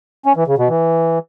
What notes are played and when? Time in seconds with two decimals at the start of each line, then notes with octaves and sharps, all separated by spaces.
0.26 C#4
0.36 E3
0.47 C#3
0.58 B2
0.69 E3